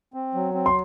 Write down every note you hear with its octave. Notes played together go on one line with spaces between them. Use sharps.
C4
F#3
C4
C6